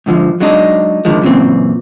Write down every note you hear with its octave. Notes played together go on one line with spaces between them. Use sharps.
G#2 D3 E3 F3
F#3 G#3 D4 D#4
D3 D#3 F3 G#3
F#2 A#2 C#3 E3 C4